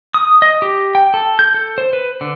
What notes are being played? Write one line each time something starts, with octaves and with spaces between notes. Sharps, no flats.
D#6
D#5
G4
G5
A4
G6
A4
C5
B4
D3